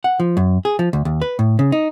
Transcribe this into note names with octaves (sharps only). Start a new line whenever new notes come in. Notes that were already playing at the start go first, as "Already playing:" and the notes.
F#5
F3
F#2
G#4
F3
D2
D#2
B4
A2
C#3
D#4